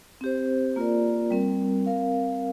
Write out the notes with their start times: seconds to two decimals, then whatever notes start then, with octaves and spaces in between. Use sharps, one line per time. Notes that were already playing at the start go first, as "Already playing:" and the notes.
0.21 C4 G4 C5
0.76 A#3 F4 A#4 D5
1.31 G3 C4 A#4
1.86 C4 A#4 F5